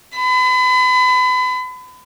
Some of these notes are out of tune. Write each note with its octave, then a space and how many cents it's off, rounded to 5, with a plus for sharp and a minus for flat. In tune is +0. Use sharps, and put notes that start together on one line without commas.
B5 +35